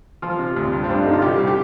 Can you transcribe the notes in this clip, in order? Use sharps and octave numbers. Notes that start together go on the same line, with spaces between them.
F3 F4
C3
D2
G2
C4
G2 D4
D3 D#4
F4
C2 G4
C2
G4